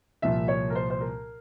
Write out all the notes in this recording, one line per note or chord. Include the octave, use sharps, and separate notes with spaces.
C2 A#2 F3 E5
C#5
A#4
C5
C5
A#4